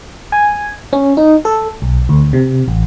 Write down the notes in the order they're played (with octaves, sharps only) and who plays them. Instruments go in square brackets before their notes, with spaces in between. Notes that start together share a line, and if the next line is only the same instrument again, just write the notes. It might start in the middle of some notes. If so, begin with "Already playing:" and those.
[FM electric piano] G#5
C#4
D#4
A4
B1
D2
C3
A1